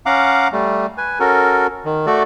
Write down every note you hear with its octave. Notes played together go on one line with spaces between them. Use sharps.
C#4 F5 F#5 A#5 D6
G3 A3
B4 G#5
C#4 F#4 A4 A#4
D#3
A3 F#4 A4 D5